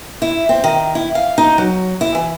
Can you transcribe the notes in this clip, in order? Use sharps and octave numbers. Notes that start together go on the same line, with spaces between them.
E4
C4
D#3
E4
F5
D#4
F#3
E4
E3